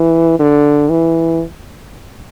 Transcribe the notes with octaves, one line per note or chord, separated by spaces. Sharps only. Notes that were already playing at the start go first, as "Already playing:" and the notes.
Already playing: E3
D3
E3